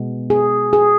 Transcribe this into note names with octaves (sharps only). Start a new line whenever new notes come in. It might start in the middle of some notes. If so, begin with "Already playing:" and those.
Already playing: B2 G#3 B3
G#4
G#4